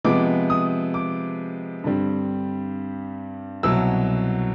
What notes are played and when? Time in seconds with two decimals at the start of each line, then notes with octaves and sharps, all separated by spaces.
0.04 C3 F3 G#3 B3 D6
0.50 D#6
0.94 D6
1.84 G2 D3 G3 C4
3.63 C2 B2 F#3 E6